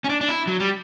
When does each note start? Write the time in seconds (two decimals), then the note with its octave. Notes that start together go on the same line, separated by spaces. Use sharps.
0.04 C#4
0.09 D4
0.21 D4
0.28 E4
0.47 F#3
0.60 G3